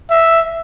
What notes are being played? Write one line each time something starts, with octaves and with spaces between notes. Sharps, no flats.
E5